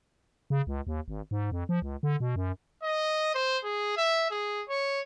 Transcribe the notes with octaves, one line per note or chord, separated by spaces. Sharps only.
C#3
C#2
D#2
G#1
G#2
F2
F3
C#2
D3
B2
F#2
D#5
C5
G#4
E5
G#4
C#5